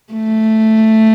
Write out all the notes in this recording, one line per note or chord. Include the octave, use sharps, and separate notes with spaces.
A3